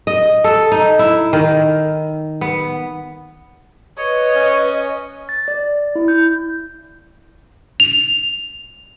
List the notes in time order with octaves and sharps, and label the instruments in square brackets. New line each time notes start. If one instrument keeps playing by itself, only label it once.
[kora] D#5
A4
D#4
E4
D#3
B3
[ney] B4 [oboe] C#5 [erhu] D#5
[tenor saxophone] C#4
[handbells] A6
D5
E4
G6
[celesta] F7